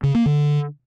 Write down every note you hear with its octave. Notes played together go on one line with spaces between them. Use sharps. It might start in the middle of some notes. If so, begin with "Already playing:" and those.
C#3
A#3
D3